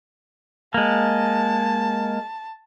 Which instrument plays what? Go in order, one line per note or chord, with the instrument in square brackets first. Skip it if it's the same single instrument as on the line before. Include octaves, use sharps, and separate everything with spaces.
[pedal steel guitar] G#3 A#3 [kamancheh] A5